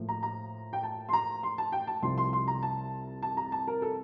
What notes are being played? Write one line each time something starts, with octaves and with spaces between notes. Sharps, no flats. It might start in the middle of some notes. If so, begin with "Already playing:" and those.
Already playing: A2 F3 A#3
A#5
A#5
G5
A5
C6
A#5
C6
A5
G5
A5
C2 C3 F3 C6
C6
C6
A#5
A5
A5
A#5
A5
A#4
A4